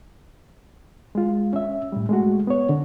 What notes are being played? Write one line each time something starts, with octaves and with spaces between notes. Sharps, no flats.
G#3 F4
C#4 E5
A2 G3
G#3 A3 F#4
B3 C#5
D3